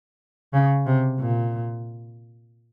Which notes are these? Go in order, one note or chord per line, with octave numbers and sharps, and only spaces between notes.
C#3
C3
A#2